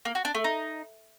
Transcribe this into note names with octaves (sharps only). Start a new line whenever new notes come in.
A#3
F#4
D4
A3
D#4